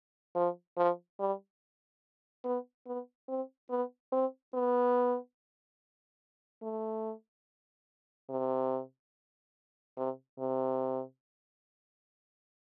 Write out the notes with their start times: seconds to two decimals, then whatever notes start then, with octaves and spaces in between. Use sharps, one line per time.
0.35 F3
0.77 F3
1.19 G3
2.44 B3
2.86 B3
3.28 C4
3.70 B3
4.12 C4
4.54 B3
6.62 A3
8.30 C3
9.97 C3
10.39 C3